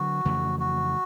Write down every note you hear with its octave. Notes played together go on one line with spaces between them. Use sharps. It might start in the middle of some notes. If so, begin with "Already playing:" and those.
Already playing: D3 F#3 F#4
F2 C#3 E3 A3
F#4